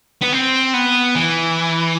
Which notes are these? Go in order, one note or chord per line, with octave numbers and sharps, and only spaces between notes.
B3
C4
B3
E3